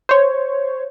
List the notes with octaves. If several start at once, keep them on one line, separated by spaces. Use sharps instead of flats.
C5 C#5